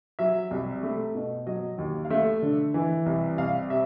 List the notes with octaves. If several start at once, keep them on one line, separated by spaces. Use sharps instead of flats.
F#3 E5
C2
A3
B2
F#3 D#5
D#2
F5
A3 E5
D3
E3
C2
C2 F5
C3 E5